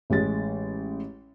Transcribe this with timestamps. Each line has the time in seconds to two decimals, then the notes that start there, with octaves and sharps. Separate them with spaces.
0.10 A1 G#3 A6